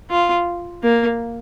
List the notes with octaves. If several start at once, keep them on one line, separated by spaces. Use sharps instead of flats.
F4
A#3